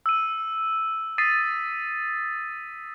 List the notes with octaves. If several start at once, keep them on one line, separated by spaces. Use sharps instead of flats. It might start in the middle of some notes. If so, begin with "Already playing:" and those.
E6 D#7
D#6 A6 B6 C7 D#7